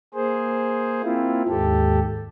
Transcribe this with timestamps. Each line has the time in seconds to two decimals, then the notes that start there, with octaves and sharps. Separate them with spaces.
0.14 A#3 G#4 C5
1.03 A#3 C4 E4 F4
1.48 D#2 G#2 G4 A4